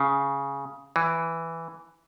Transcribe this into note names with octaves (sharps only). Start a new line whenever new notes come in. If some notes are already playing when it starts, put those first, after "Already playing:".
Already playing: C#3
E3